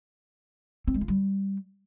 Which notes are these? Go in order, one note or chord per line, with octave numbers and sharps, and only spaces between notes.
C4
G#3
F4
G3